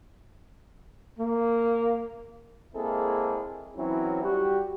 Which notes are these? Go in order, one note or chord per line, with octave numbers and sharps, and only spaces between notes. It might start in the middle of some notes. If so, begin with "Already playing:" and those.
A#3
G#3 A#3 C4 E4 G#4 A4
E3 F#3 C4 C#4 E4
G3 F#4 G4